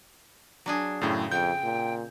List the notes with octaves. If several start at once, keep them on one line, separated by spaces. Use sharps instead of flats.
F#3 D4 G#4
F#2 A2 C#3 C4
F2 G5 G6
A#2